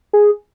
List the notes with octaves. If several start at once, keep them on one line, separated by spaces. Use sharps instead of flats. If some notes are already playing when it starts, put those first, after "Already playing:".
G#4